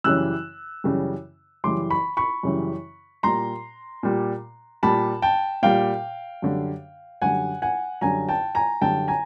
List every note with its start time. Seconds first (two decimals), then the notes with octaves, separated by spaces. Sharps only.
0.04 F#2 C#3 E3 G3 E6 F#6
0.84 F#2 C#3 E3 G3
1.64 F#2 C#3 E3 G3 C6 D6
1.90 B5 C#6
2.17 B5 C#6
2.43 F#2 C#3 E3 G3
3.23 A#2 G3 A#5 C6
4.03 A#2 G3
4.83 A#2 G3 A5 B5
5.22 G5 A5
5.62 A#2 G3 F5 G5
6.42 F#2 D3 G3
7.22 F#2 D3 G3 F#5 G#5
7.62 F#5 G#5
8.01 F#2 D3 G3 G#5 A#5
8.29 G5 A5
8.55 G#5 A#5
8.81 F#2 D3 G3 G5 A5
9.08 G#5 A#5